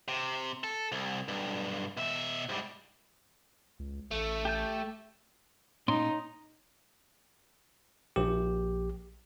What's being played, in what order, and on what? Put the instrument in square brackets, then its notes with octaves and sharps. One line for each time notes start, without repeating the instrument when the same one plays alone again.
[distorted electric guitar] C3
A4
C2
B1 G2
B2 E5
G#2 G3
[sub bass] C#2
[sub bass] A1 [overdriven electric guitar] A3
[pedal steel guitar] G4 A5 G6
[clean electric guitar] A#2 C#4 C6 [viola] D#4
[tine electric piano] A#1 G4